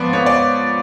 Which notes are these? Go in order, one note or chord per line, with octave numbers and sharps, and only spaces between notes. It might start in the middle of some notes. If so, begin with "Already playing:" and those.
Already playing: G#2 F3 B3 D5
B3 C#5
D5